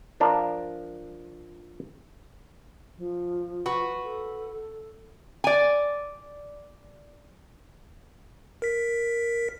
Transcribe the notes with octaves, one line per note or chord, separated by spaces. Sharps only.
F3 D4 A#4
F3
F#4 B4
A4
D5 G#5
A#4 B6